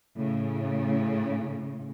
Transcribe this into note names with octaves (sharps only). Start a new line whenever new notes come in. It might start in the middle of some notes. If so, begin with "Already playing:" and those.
A2 C#3